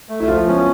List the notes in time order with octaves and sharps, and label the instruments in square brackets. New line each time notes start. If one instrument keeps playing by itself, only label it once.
[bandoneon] A3
[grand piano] E4
[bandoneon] F3 [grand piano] F4
[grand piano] B3 [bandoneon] C#4